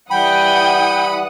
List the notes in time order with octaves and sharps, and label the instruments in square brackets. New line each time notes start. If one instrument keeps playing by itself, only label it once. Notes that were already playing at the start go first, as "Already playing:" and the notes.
[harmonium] E3 G3 [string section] E4 F#5 D#6 [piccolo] G5 [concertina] B5